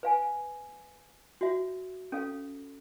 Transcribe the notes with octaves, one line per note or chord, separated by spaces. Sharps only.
B4 F5 G#5
F#4 E5
C#4 A4 F5